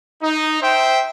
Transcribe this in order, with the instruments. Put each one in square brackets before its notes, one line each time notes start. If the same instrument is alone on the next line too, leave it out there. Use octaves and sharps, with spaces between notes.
[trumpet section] D#4
C5 E5 G5